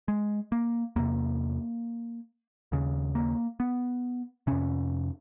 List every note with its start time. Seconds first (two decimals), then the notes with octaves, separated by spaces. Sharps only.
0.08 G#3
0.52 A#3
0.96 E2 C3 A#3
2.72 D#2 C#3
3.15 A#3
3.60 B3
4.47 F2 C3 C#4